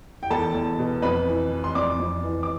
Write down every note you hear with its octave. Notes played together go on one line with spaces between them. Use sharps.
G5
E2 A4 A5
E2
B2
F2 B4 B5
E3
E3
C6
F2 D5 D6
F2
E3
D6